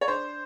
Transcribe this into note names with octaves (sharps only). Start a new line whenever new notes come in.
C#5
D4 C5